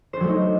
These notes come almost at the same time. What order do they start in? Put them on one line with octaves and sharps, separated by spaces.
C5 D4 F#3 A3 D#4